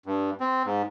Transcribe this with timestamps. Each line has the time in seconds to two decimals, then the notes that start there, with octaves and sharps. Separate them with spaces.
0.06 G2
0.40 C4
0.66 G#2